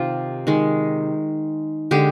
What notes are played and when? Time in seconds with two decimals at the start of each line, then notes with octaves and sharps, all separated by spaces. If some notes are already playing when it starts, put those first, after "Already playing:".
Already playing: C3 D#3 D#4 F4 G4
0.47 D#3 G#3
1.91 D3 G#3 G4